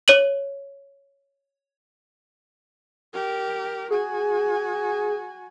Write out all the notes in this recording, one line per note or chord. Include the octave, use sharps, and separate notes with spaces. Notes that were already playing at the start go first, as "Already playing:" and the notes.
C#5 D#7 F#7
G4 A#4
F#4 G#4 G#5